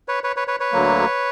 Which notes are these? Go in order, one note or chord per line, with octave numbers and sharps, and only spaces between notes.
B4 C#5
B4 C#5
B4 C#5
B4 C#5
B4 C#5
D2 D3 F#3 A#3